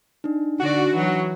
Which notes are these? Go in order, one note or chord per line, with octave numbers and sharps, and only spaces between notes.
D4 D#4
D3 F#4 D5
E3 F#3